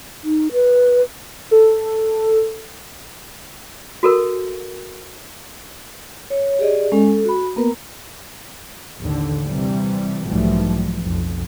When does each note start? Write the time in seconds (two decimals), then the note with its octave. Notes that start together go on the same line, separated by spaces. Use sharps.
0.24 D#4
0.52 B4
1.51 A4
4.03 F#4 A4 A#4
6.30 C#5
6.59 G4 G#4 D5 D#5
6.92 G#3 C#4 A4
7.08 A4
7.25 F#4 B5
7.56 A#3 B3 A#4 B4
8.98 A1 D#2 D3
9.45 C3 E3 G3
10.25 B1 G#2 E3 F3 G3 A3
10.99 B1 F2